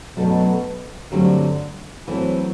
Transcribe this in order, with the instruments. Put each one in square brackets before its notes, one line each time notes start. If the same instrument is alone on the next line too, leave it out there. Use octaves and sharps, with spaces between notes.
[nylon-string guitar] F#2 F#3 A3 D4 A4 [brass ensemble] B2
[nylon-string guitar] G2 F#3 A3 C4 G4 [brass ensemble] D3
[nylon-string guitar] E3 A3 C4 [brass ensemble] F#3